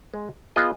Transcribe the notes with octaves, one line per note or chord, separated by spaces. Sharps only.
G#3
B3 F4 G#4 D#5